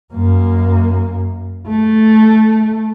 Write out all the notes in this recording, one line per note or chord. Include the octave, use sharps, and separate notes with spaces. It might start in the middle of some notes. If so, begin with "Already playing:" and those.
F#2 A#3
A3